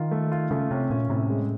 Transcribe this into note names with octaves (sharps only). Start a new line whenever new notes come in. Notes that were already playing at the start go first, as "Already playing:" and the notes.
Already playing: D#3 F4
A3
F4
C#3 A3
C3 C#4
A#2 C#4
A2 C3
G#3